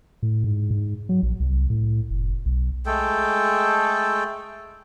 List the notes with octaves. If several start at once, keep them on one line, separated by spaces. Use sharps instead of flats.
A2
G#2
G#2
F#3
A#1
C2
A2
F1
B1
G#3 A3 A4 G5